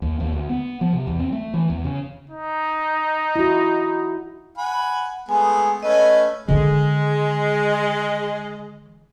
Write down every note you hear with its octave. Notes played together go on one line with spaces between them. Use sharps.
D#2
D#2
D2
B3
F3
C3
E2
C4
A3
E3
E2
C#3
D#4
E4 F#4
F#5 G#5 B5
G#3 A3 B3 G#5
A3 C#4 B4 D#5
D3 D#3 G#3